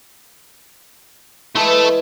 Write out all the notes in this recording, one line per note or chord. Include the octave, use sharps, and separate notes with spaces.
E3 G#3 A3 E4 A4